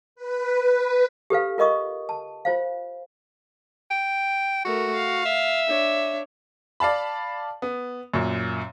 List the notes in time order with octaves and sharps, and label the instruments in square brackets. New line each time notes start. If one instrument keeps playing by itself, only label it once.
[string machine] B4
B4
[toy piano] G4 A4 B4 F5
F4 A#4 D#5 C#6 D#6
A5
F4 C5 F5
[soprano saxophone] G5
[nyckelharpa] A3 A#4 [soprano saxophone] F#4
[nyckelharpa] F5
[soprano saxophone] E5
[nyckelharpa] D4 C#5
[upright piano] D5 F5 A5 B5
B3
F#2 A#2